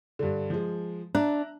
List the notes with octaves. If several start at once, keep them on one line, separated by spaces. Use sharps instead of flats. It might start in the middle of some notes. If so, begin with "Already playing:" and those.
G2 D3
F3 G#3
D4 E5 A#5 F#6